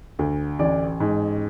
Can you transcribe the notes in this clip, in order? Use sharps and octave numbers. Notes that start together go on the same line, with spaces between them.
D2
A1 D5
G#2